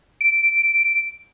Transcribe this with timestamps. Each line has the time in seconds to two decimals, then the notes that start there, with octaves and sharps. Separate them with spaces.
0.21 D7